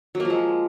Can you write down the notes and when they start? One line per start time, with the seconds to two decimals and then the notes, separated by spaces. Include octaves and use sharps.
0.15 F#3
0.20 A#3
0.25 F3
0.30 G#3